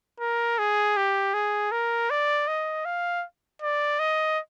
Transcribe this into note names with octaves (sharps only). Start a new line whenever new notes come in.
A#4
G#4
G4
G#4
A#4
D5
D#5
F5
D5
D#5